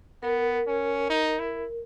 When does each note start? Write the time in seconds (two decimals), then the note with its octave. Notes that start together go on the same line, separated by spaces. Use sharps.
0.23 B3 A#4
0.67 C#4
1.10 D#4
1.39 E4